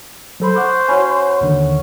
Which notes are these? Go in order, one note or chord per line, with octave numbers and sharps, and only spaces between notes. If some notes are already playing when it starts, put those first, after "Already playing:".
F#3 A4 C5 B5
F#5 C#6 D6
C#4 F#4 G#5 B5
D#2 D3 D#3